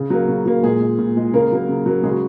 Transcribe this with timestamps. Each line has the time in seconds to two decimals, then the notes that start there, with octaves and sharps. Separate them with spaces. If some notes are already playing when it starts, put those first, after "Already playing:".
Already playing: C#3
0.10 F#3 A#3
0.28 C#3
0.46 F#3 A#3
0.63 A#2 G#3 G#4
0.81 G#3
0.99 A#2
1.17 G#3
1.34 C#3 A#3 A#4
1.52 F#3 A#3
1.68 C#3
1.86 F#3 A#3
2.03 C#3 G#3 G#4
2.11 F#4